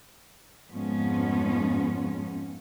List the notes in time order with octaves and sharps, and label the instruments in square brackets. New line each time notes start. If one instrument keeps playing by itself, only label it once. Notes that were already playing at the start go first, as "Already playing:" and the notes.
[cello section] F2 G#2 F3 G#3 B3 C#4